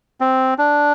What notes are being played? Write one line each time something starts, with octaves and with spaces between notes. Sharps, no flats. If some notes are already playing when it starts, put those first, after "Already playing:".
C4
D4